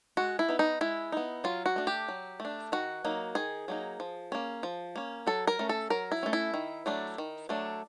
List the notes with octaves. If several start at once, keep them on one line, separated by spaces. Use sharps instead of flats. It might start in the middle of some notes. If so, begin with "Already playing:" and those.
G#3 F#4
E4
B3 D#4
D#4
G#3 E4
B3 D#4
F#3 F4
F#4
A3 D4
G4
F#3
A3
D4
D#3 F#4
F#3 A#3 D#4
D#3 G#4
F#3 A#3 D#4
F3
A#3 C#4
F3
A#3 C#4
F#3 A4
A#4
A3 C#4
A4
F#3 A#4
E4
A3 C#4
E4
D#3
F#3 A3 D4
D#3
F#3 A3 D4